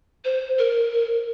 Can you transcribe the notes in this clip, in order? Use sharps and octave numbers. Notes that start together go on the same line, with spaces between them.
C5
A#4